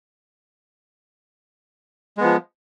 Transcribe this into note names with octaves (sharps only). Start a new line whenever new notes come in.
F3 G#3 B3